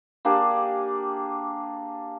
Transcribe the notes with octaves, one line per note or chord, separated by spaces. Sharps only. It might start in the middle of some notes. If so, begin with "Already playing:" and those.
A#3 D4 G4 G#4